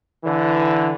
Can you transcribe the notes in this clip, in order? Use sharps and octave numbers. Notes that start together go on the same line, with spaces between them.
D3 E3